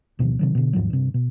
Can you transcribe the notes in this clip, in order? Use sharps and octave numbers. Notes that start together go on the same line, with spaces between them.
D1 B2 D#3 F3
C3 D#3 F#3
B2 D3
D#2 G#2 F3 F#3
G2 C3
B2